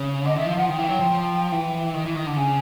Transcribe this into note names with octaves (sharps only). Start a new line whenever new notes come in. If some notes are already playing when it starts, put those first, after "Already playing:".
Already playing: C#3
D3 D#5
D#3 E5
F3 F5
F3 F#5
D#3 G5
E3
F#3
F3
F3
E3
D#3
E3
D#3
D3
C#3 G#5